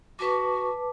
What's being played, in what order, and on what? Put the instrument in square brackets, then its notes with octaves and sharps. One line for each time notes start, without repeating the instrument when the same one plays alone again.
[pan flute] F#4 [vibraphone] B4 A5 D6